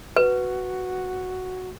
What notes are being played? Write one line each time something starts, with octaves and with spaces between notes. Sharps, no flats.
F#4 B4